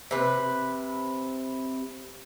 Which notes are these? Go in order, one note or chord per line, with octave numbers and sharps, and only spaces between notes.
C3 B4